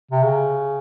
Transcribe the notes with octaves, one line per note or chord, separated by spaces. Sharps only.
C3
C#3